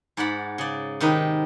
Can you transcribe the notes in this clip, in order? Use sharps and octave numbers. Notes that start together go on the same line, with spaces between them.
G#2 D5 F#5 B5
C#3 D5
C3 D#3 D#4 B4